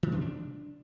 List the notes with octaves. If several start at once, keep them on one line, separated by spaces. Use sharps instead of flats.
D#3
B2
D4